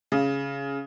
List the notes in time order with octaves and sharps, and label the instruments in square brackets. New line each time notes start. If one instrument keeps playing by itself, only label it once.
[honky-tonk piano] C#3